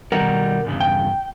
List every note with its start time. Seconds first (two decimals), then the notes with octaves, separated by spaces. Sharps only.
0.12 B1 D#3 G3 A#4 F#5
0.65 E2 G2 C#3
0.81 G5